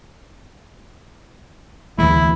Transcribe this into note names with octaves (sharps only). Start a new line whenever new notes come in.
D2 E3 G#3 E4